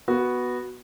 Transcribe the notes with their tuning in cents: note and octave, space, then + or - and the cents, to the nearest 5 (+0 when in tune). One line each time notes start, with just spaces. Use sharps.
B3 -5 F#4 +0